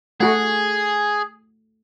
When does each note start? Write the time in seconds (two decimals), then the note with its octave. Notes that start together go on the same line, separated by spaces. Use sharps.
0.20 A3 F#4 G#4 A4 F#5